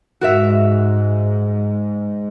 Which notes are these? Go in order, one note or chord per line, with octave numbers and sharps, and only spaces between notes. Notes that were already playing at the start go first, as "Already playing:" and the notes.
G#2 F#4 A#4 E5